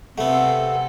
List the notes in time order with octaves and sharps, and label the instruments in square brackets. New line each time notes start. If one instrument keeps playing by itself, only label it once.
[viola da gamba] C3 C4 A4 [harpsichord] A3 B3 [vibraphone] F#5